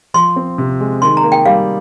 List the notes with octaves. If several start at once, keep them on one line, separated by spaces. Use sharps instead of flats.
F3 C6
C4
C3
G#3
D#3 C6
A#5
A#3
G5
G3 F5